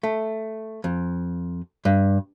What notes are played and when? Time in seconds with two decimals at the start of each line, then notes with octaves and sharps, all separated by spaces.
0.03 A3
0.84 F2
1.85 G2